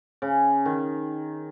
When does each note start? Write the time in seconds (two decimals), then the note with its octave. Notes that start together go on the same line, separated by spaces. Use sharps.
0.22 C#3
0.65 D#3